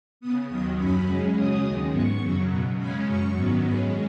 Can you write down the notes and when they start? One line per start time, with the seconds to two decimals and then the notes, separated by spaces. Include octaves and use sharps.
0.20 C#3 B3 D#6
0.49 D#2 D#3 F#3 D#6
0.78 F#2 F#3 C#4 B5
1.06 C#3 G#3 C#4
1.35 C#3 F#3 C#4 D#6
1.63 D#2 D#3 G#3
1.91 G#2 F#3 B3 C#6
2.20 F#2 C#3 F#3 C#4
2.49 B2 B3
2.77 C#3 G#3 C#4 B5
3.06 F#2 F#3 C#4 C#6
3.35 G#2 D#3 F#3 B3
3.63 G#2 G#3 C#4 B5